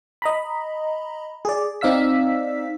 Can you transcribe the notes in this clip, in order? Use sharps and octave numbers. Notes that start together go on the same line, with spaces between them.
D#5 A#5 B5
G#4 D5
C4 D#4 D5 F5 E6 B6